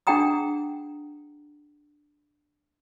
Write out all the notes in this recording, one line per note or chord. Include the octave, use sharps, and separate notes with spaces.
D4 G#4 F#5 G5 A#5 D#6